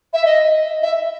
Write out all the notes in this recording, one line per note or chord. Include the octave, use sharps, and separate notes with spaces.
E5
D#5
E5